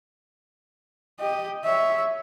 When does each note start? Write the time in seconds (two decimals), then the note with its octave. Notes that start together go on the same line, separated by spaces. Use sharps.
1.20 G4 D#5
1.65 C#5 E5